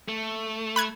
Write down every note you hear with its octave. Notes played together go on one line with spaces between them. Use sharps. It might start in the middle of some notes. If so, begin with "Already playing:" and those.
A3
B5 F#6 G#6